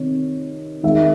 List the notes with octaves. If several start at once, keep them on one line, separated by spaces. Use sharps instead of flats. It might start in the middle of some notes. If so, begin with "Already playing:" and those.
Already playing: C3 D#3 C#5
D#3 G#3 E5